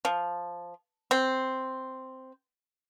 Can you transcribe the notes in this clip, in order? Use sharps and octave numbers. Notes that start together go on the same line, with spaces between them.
F3
C4